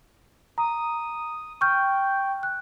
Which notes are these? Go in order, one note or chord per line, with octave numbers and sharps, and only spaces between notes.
A#5 D#6
G5 C#6 F6 G6
F#6